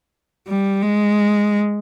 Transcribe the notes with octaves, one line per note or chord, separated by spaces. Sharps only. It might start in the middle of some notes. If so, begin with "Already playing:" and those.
G3
G#3